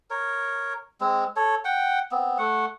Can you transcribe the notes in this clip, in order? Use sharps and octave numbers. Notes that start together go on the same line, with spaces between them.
A#4 C#5
G#3 C4
A4 C#5
F#5 G5
B3 C4
A3 F#5